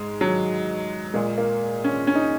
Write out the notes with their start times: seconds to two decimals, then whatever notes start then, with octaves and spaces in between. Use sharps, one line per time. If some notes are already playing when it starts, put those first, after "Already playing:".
Already playing: G#2 G#3
0.21 F#3
1.14 A#2 G#3
1.38 A#3
1.84 C#4
2.07 C#4
2.15 D#4